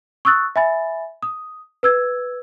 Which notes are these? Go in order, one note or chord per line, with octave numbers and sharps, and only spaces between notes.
C#6 D#6 E6 F#6 A6
E5 G#5 B5 A6
D#6
B4 E6 G#6